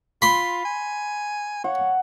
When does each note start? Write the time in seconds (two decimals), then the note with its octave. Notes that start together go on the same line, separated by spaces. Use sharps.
0.22 F4 B5 C6
0.65 G#5
1.64 C#5 F#5